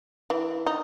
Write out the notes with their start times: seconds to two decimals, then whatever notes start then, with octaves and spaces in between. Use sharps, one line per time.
0.30 E3
0.66 D#4